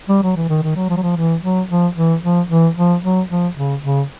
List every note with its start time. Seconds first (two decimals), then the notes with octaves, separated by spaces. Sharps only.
0.09 G3
0.23 F#3
0.36 E3
0.49 D#3
0.63 D#3
0.76 F#3
0.89 F3
0.97 F#3
1.02 F3
1.16 E3
1.42 F#3
1.69 F3
1.96 E3
2.23 F3
2.49 E3
2.76 F3
3.02 F#3
3.29 F3
3.56 C#3
3.83 C#3